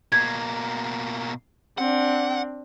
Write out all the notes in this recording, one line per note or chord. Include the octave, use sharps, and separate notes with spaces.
B2 A#3 G#6
C4 D4 F#5